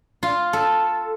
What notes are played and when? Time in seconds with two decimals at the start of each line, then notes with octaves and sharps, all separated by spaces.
0.23 F4
0.53 A4